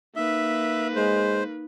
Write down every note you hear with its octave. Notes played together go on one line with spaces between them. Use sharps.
A#3 D#4 B4 E5
G#3 C5